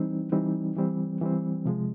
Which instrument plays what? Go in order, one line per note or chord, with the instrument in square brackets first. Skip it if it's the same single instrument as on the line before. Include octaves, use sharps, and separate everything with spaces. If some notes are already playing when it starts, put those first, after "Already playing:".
Already playing: [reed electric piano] E3 G3 C4 D#4
E3 G3 C4 D#4
E3 G3 C4
E3 G3 C4
C3 F3 G#3